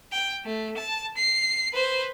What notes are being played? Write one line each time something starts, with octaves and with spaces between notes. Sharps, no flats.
G5
A3
A5
C7
B4 C5